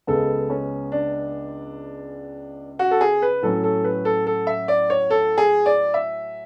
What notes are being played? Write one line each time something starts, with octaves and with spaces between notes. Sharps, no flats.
C#2 C#3 G#3 B3 A4
C#4
D4
F#4
A4
G#4
B4
A2 F#3 C#4 A4
A4
B4
A4
A4
E5
D5
C#5
A4
G#4
D5
E5